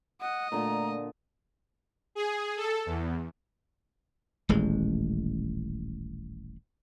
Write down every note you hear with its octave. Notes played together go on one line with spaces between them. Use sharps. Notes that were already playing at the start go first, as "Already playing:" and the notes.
D#5 F#5
A#2 D3 A3 A#5
G#4
A4
E2
D#1 A1 G#3